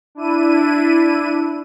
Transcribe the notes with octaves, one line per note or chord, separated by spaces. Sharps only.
D4 E4 D#7